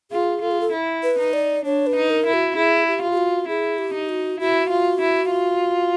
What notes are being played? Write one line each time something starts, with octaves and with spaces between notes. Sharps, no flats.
F4 G#4
F4 A4
G#4
A4
E4
B4
D#4
D5
D4 C#5
B4
D#4
A#4
E4
F#4
E4 G#4
G4
F4
G4
F#4
E4 G#4
G4
D#4
F#4
E4 F#4
F4
E4
F4